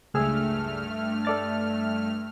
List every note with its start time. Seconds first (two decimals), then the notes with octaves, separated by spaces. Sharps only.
0.14 C#2 G2 A3 G#4 E6 F6
1.25 A4 D5 A6